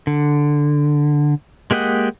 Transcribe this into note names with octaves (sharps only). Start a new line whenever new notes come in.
D3
G#3 A#3 G4 D#5 F#5